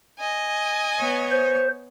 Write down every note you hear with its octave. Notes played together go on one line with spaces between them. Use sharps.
D#5 G#5
B3 C#5
C5